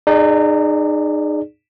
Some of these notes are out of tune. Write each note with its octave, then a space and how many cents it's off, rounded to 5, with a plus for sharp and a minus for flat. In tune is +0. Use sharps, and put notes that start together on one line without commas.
D#4 -30 G#4 +0 D5 +0